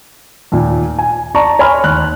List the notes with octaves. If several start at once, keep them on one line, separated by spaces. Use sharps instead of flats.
D#2 A#2
G#5
D5 A5 A#5 C#6
C#5 G#5 B5 C6 F6
D#2 F#6